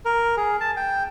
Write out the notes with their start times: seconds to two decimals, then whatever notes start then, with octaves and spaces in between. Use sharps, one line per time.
0.05 A#4
0.37 G#4
0.61 A5
0.77 G5